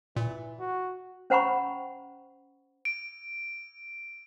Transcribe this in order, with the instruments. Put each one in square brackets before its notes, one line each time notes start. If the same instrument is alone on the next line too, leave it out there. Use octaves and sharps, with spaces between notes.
[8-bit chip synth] A#2 [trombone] E3
[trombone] F#4
[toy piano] C#4 C5 F#5 A#5 B5 C#6
[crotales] D7